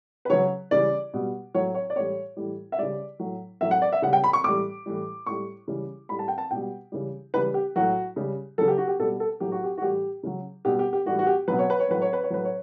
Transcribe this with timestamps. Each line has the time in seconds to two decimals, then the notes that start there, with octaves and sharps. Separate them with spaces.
0.25 B4
0.30 C#3 F#3 C#5
0.71 C#3 E3 G3 D5
1.14 B2 G3
1.55 A2 F#3 C#5
1.75 C#5
1.90 D5
1.96 A2 E3 G3 C#5
2.37 A2 E3 G3
2.72 E5
2.78 C#3 G3 D5
3.19 A2 F#3
3.61 A2 F#3 E5
3.71 F#5
3.82 D5
3.92 E5
4.02 C#3 F#5
4.06 G3
4.13 G5
4.24 B5
4.33 C#6
4.44 A2 E3 G3 D6
4.86 A2 E3 G3
5.26 A2 G3 C#6
5.68 C#3 E3 G3
6.09 A2 G3 B5
6.19 A5
6.28 G5
6.38 A5
6.51 B2 G3 G5
6.92 C#3 E3 G3
7.34 C#3 E3 G3 B4
7.54 G4
7.76 A2 F#3 F#4
8.16 C#3 G3
8.58 C#3 F#3 A4
8.68 G4
8.78 F#4
8.88 G4
8.99 B2 G3 A4
9.20 A4
9.40 A2 F#3 G4
9.52 F#4
9.64 G4
9.78 F#4
9.81 A2 E3 G3 G4
10.23 C#3 F#3
10.65 B2 G3 G4
10.79 G4
10.93 G4
11.06 A2 E3 G3 F#4
11.19 F#4
11.27 G4
11.48 B2 F#3 B4
11.59 C#5
11.70 B4
11.80 C#5
11.88 A2 F#3 B4
12.02 C#5
12.13 B4
12.23 C#5
12.30 A2 F#3 B4
12.45 C#5